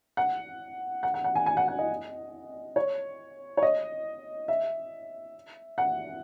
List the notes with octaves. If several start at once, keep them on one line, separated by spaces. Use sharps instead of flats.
F#5
F#5
F#5
F#5
G#5
G#5
F#5
F#5
D#5
C#5
C#5
D#5
E5
F#5